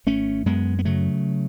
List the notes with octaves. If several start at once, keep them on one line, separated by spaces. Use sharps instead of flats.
G#1 A3 C#4
F#2 G#3 B3
B3
C#3 F#3 A3